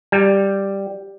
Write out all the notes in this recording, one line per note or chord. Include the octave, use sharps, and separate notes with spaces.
G3